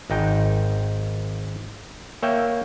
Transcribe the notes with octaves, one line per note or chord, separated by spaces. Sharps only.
G#1 D#4 G5
A#3 C#5 E5 G5